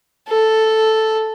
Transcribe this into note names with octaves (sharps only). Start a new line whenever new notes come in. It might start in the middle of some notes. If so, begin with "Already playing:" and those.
A4